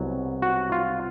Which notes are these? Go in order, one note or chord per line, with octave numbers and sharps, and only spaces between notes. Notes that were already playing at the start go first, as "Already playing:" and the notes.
Already playing: C2 B2 F#3
F#4
F4